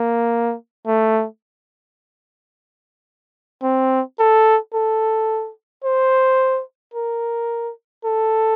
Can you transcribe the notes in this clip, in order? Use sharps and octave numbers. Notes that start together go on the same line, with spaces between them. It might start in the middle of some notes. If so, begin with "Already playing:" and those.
Already playing: A#3
A3
C4
A4
A4
C5
A#4
A4